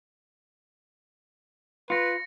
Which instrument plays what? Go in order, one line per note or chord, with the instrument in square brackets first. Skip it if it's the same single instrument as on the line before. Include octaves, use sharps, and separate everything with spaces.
[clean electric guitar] F4 [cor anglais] B4 [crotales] A#6 C#7